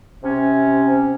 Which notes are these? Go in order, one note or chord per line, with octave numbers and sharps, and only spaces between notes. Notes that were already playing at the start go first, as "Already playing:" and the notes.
C3 C#4